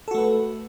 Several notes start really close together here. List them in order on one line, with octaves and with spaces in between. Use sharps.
A4 F#4 A3 B4